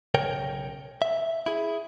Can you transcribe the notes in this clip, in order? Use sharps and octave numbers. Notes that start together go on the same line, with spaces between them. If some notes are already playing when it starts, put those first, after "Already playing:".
B1 C#3 A#4 C#5 G5
E5
E4 G#4